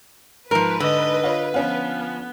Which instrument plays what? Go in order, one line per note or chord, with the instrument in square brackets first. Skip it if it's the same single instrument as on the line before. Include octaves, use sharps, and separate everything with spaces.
[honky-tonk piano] G#2 [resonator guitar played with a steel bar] F3 A#4 [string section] B4
[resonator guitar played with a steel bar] D3 [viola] D#5
[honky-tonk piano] F4 C#5
[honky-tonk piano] F3 C#4 F4 [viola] B3